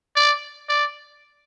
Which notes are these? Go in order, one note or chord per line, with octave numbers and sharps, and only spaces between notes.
D5
D5